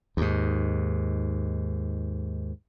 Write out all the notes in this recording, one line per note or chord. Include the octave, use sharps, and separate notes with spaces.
D#2 G#2